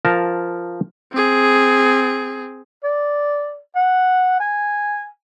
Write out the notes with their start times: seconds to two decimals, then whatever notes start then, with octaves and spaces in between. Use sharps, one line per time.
0.05 F3 A#4 A5 A#5
1.13 C4 G#4
2.84 D5
3.76 F#5
4.40 G#5